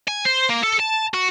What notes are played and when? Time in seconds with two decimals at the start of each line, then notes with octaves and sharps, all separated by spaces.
0.08 G#5
0.25 C5
0.49 A#3
0.63 A4
0.79 A5
1.14 F#4